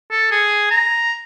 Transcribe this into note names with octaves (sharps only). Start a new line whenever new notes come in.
A4
G#4
A#5